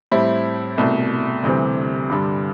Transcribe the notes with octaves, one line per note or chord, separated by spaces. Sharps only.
A2 G3 C4 E4
C2 B2 A3
D2 C3 E3 G3 C4
G2 D3 G3